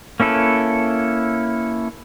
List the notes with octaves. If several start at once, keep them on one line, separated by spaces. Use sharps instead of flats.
A#3 C#4 E4 A4 B4